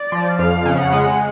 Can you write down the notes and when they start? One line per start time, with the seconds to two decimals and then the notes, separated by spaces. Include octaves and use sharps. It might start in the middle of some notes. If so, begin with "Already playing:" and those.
Already playing: D5
0.12 F3
0.39 F2 F5
0.65 C#3
0.79 F#5
0.93 G#3